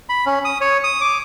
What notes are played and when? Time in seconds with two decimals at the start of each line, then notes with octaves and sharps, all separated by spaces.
0.09 B5
0.26 C#4
0.45 D#6
0.61 C#5
0.84 D#6
1.01 D6